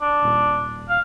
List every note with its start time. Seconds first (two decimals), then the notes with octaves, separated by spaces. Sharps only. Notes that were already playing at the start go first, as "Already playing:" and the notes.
0.01 D4
0.23 D#1
0.89 F5